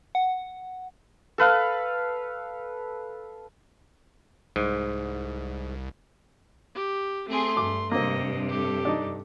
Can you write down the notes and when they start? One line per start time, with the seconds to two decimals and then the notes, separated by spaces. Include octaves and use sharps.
0.15 F#5
1.38 A4 B4 F5
4.56 C2 G#2
6.75 G4
7.28 A3 C4 G#4 C6
7.57 G2 D6
7.91 G2 C3 A#3 C4 D#5
8.49 G4 A4
8.85 D4 D#4